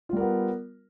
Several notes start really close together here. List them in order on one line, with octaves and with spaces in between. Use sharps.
F4 G3 A#4 B3